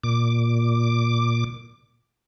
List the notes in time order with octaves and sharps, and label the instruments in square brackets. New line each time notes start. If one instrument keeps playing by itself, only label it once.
[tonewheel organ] A#2 D6